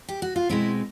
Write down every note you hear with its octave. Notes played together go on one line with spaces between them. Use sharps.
G4
F#4
F4
B2 G#3 C4 E4